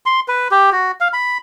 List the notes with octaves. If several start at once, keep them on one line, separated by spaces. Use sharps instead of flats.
C6
B4
G4
F#4
F5
B5